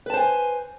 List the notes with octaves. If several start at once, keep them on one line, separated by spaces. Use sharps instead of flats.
B4 C5 G#5 A5